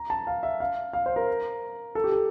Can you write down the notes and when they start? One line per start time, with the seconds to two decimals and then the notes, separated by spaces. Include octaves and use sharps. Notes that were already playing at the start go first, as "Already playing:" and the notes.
Already playing: A#5
0.10 A5
0.27 F5
0.43 E5
0.60 F5
0.93 F5
1.06 C5
1.16 A#4
1.95 A4
2.04 G4
2.12 A4